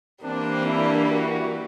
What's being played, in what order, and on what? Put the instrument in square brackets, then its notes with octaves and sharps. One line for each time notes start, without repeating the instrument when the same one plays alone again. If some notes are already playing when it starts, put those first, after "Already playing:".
[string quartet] E3 G3 A#3 [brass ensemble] C4 D4
[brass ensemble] D4 E4
E4 F#4